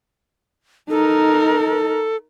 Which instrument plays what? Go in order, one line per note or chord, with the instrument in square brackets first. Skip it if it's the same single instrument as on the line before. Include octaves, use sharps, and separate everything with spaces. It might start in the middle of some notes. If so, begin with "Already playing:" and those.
[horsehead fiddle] D#4 A#4 [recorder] A4